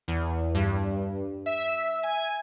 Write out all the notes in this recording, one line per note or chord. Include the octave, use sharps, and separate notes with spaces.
E2
G2
E5
G#5